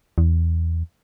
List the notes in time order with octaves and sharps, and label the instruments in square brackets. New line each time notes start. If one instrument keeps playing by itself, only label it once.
[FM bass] E2